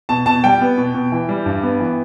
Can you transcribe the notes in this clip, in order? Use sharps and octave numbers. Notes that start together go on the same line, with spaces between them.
B2 A5
B2 A5
G3 G5
B3
B2
B2
E3
G3
G2
B3
E3